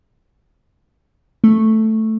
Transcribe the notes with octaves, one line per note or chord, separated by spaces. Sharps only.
A3